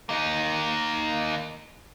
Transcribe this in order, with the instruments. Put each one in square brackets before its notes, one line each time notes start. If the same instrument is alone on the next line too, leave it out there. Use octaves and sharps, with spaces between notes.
[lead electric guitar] A#3 D#4